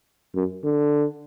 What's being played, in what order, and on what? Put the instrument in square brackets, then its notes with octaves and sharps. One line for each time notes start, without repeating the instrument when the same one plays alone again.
[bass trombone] F#2
D3